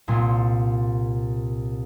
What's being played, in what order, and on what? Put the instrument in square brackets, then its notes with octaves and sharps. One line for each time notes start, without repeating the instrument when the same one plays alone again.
[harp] C2 A#2 C6